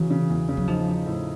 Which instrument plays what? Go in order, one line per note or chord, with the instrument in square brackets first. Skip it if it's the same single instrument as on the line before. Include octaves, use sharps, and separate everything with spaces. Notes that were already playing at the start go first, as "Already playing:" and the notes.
Already playing: [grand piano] C#3 F#3 [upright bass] E3
[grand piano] C#3
E2
C#3
[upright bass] F#3
[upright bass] F3 [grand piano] D#4
[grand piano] D#4
A2